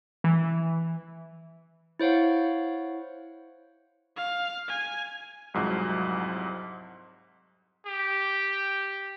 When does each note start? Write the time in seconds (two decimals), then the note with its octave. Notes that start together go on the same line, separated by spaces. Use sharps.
0.24 E3
1.99 E4 C5 C#5 F5 F#5
4.16 F5
4.68 G#5
5.54 C2 F2 G#2 F3 F#3
7.86 G4